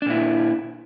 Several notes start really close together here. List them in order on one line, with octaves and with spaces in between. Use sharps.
D4 A#2 E4